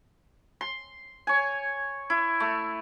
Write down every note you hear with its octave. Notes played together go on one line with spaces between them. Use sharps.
C6
C#5 G#5
E4
A3